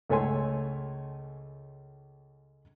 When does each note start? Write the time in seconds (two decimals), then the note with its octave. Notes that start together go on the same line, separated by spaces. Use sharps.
0.10 C#2 A3 C#5 G#5 C6